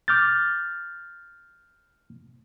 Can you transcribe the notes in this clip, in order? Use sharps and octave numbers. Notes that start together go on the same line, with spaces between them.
D6 F6 G6 A6